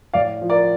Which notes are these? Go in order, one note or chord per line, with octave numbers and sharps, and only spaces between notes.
A2 D5 F5
F3
A#4 D5